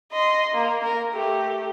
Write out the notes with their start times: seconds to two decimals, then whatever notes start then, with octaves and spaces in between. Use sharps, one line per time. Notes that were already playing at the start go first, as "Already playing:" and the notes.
0.12 D#5 C6
0.54 A#3
0.84 A#4
1.13 A3 G4